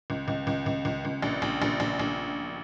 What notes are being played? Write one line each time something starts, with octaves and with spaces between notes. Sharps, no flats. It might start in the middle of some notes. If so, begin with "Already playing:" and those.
C#2
C#2
C#2
C#2
C#2
C#2
A#1
A#1
A#1
A#1
A#1